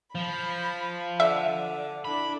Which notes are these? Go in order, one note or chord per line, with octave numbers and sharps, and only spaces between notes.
F3 B5
D3 D5 E5
D4 E4 A4 B5